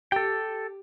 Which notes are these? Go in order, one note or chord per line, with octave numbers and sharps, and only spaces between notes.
G4 A4 G5